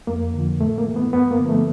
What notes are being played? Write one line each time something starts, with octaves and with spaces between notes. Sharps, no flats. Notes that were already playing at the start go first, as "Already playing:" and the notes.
F2 A#3
D3 F3
A2 A3
A#3
E3
B3
G2 B3
A#3
D3 F3
A3